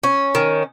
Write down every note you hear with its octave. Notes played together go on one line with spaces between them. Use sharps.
C#4
D#3